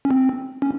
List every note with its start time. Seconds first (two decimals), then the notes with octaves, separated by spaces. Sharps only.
0.05 C#4
0.11 C4
0.62 C#4